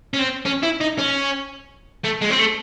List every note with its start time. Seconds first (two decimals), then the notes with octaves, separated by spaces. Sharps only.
0.14 C#4
0.19 C4
0.46 C#4
0.63 E4
0.81 D#4
0.98 C#4
2.04 A3
2.21 G#3
2.30 C4
2.39 A3